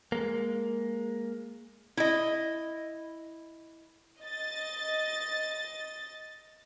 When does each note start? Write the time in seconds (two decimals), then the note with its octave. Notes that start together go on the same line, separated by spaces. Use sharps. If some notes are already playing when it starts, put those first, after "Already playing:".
0.12 G#3 A#3
1.97 E4 D#5
4.21 D#5 A6